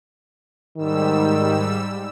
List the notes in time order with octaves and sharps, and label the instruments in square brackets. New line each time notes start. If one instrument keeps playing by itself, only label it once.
[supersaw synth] G#2 G3 E6 [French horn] D#3